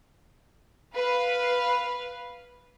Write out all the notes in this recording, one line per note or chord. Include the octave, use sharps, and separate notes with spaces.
B4 F5